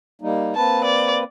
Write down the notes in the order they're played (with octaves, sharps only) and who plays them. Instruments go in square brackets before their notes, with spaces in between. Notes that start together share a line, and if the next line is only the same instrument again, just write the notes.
[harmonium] G3 A#3 D#4
[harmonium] A#3 C4 B4 [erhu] A5
[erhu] D5